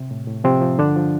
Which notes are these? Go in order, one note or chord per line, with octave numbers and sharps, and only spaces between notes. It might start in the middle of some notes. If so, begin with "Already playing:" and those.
Already playing: C3
A2
A2
C3 F3 C4
F3
G2 D3 D4
F3